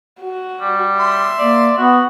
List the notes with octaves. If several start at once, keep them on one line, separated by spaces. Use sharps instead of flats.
F#4
G3
E5 C6
A#3 D5
B3 F#4